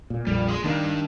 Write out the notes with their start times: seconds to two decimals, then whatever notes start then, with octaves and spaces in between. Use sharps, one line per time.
0.10 A#2
0.27 A#1 F2 A#2 G3
0.48 G#4 C6
0.64 D#3 G3 A#3 D4